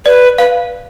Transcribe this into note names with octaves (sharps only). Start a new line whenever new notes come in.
B4 D5
B4 F5